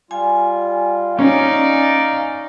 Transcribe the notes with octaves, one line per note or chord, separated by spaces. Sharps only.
G3 F4 G#5
C#4 D#4 D5 F5